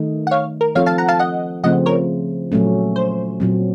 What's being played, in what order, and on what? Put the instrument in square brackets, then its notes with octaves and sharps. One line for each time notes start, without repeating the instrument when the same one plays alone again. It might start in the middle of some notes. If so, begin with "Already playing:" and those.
Already playing: [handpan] D#3 A3 D#4
[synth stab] F#5
C#5 F5
A#4
[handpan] F3 C4 F4 A4 [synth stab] C#5 F5
[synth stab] F5 A5
F#5 A#5
F5 A5
D#5 F#5
[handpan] C#3 F3 A3 C4 [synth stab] D#5 F#5
[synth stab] A#4 C#5
[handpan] A#2 F#3 A3 C#4
[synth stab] C5
[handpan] A#2 F#3 C4